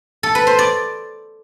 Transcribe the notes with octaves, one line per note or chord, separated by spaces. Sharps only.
A4
B4
C5
D5